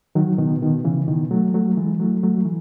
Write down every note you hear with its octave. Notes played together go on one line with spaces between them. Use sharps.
D#3 F#3
B2 D#3
B2 D#3
C#3 E3
B2 D#3
F#3 A3
F#3 A3
E3 G#3
F#3 A3
F#3 A3
E3